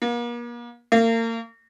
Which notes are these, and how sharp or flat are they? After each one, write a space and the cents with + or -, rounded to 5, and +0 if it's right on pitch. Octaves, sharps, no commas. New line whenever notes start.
A#3 +40
A#3 -35